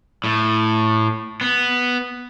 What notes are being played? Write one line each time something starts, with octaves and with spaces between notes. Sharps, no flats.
A2
B3